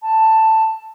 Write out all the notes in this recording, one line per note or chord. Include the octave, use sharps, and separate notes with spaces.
A5